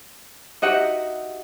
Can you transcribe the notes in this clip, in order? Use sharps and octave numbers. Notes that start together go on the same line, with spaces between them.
D#4 F#4 G4 D#5 E5 F#5